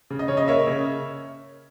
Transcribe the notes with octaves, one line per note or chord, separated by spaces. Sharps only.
C#3
D#5
C#3 C#5
D#5
A#3 C#5 E5
C#3